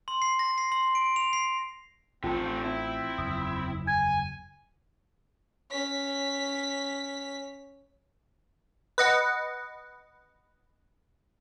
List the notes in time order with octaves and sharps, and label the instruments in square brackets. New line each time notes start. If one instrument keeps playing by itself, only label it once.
[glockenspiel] C6
C7
A#6
C7
C6
D7
F7
C7
[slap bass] A1 [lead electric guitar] C3 A4 [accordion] C4 [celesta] F4 G5
[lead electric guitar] E4
[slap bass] F#1 E2 [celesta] D#6
[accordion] G#5 [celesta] G#6
[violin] C#4 B6
[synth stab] B4 D#5 F#5